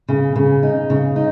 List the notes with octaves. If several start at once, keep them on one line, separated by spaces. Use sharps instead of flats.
C#3
C#3
D#4
C#3
D#4